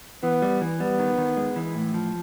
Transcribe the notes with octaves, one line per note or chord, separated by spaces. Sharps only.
E3 B3
G3
E3
G3 B3
D#3
D#3
G#3
E3
A2
F3